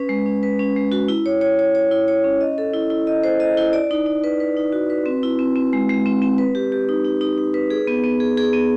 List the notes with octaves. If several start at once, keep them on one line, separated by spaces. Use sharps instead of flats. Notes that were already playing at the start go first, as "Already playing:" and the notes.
Already playing: C#4 B4
G#3
C#4
B4
C#4
G#3
F#4
E4
C#5
C#5
C#5
C#5
E4
C#5
C#4
D#5
A4
E4
E4
D#5
C5
D#5
E4
D5
D#4
D#4
B4
B4
D#4
F#4
B4
C4
E4
C4
C4
G#3
G#3
C4
C4
B4
G4
G4
D#4
D#4
D#4
D#4
B4
G#4
B3
B3
G#4
G#4
B3